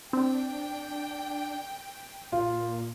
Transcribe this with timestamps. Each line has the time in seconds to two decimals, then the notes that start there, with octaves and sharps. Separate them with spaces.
0.13 C4 D4 G5
2.32 A#2 F4